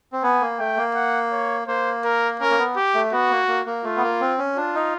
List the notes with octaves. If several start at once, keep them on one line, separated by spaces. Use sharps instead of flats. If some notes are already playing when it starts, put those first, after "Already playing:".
C4
B3 G#5
A#3
A3 G5
A#3
F#5
C#5
A#3 C5
A#4
C#4 A#4
A#3
B3
G4
A3
B3 F#4
A#3
A#3
A#3
A3 F4
B3
A#3
C4
C#4
D4 F4
D#4